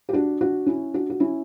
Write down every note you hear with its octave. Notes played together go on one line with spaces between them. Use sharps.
G4
D4 F#4
D4 F#4
C#4 E4
D4 F#4
F#4
C#4 E4